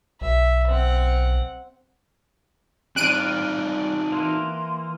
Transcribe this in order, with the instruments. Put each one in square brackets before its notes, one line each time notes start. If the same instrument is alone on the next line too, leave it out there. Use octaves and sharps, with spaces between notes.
[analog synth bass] B1 [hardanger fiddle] E5
[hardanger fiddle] C4 F#5
[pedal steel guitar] G3 F4 [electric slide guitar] C4 D#4 D5 [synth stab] F#6 D7 D#7
[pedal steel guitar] E3 A#3 [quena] C6